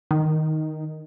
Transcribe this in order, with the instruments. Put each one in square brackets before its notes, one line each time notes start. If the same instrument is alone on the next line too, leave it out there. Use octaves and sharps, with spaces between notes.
[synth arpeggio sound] D#3